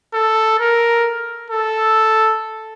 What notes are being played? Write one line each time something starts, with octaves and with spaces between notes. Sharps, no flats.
A4
A#4
A4